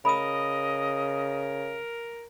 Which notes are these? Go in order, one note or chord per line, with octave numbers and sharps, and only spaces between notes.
C#3 A#4 D#5 B5 D#6